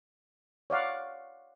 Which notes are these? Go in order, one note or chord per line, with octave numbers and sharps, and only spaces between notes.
C#5 D5 F5 F#5